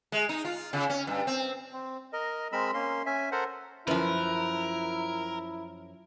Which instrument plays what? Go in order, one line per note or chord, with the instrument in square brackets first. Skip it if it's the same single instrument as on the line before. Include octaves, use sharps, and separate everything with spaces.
[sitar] G#3
D#4
F4
C#3
C#4
G2
C4
[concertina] C4
A#4 D#5
G#3 C4 A#4 B5 E6
A#3 C#4 C6
C#4 E5 G#5
A4 A#4 C5 F#5
[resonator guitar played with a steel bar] F#2 F3 [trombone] E4 [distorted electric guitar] A#4 [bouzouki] B4